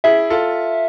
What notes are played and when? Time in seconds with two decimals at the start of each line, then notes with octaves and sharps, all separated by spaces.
0.04 E4 G#4 E5
0.30 F4 A4